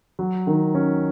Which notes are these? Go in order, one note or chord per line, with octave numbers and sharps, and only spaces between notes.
F#3
D#3
C#4